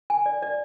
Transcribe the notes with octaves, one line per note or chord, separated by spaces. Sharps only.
G#5
D5
D5